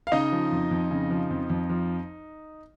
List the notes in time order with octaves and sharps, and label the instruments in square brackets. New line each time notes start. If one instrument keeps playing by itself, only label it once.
[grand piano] F5
C#3 D#4 D#5
F3
F2
F2
C#3
F3
F2
F2
F3